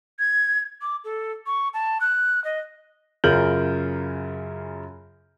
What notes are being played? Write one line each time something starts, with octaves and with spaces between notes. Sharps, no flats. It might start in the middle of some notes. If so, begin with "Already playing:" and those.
G#6
D6
A4
C#6
A5
F#6
D#5
F#2 C#3 F4 A#4 G6 F#7